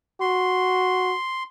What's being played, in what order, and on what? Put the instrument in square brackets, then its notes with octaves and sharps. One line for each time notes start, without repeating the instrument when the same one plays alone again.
[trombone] F#4 [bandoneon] C6